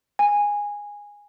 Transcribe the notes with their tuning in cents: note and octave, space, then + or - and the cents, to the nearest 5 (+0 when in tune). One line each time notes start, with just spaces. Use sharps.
G#5 -15